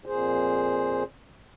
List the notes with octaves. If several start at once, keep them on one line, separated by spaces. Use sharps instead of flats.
F2 A#2 G#4 C5